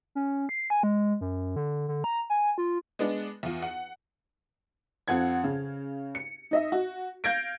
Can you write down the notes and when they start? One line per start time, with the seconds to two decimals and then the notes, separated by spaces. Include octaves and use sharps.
0.15 C#4
0.49 C7
0.70 G#5
0.83 G#3
1.21 F#2
1.56 D3
1.88 D3
2.04 A#5
2.30 G#5
2.58 F4
2.99 G#3 B3 D4
3.43 E2 F4
3.62 F#5
5.08 F2 F#5 G#6
5.44 C#3
6.15 C#7
6.51 D#4 D#5 E5
6.72 F#4
7.24 F5 G6 G#6 A#6 D7